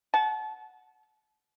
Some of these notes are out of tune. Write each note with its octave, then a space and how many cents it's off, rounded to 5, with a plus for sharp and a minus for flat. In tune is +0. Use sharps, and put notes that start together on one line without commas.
F#5 +0 A5 -35